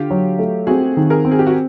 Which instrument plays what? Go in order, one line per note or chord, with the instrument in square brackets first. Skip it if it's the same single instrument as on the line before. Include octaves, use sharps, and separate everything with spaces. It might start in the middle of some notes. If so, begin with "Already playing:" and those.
Already playing: [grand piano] D3 [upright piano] F4 G4
[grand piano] F#3
A3
[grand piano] C4 [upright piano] F#4 G#4
[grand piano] D#3
[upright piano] G#4 A#4
[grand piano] C4
[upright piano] G#4
G4
F#4